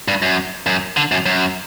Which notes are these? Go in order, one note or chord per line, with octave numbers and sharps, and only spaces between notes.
G2
F#2
F#2
D3
F#2
F#2